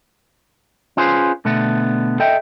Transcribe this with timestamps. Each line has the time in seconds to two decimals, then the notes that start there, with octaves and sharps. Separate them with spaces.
0.97 C#4 F4 G#4 B4 C5
1.45 B2 D3 A3 B3
2.20 A4 D#5 E5 G5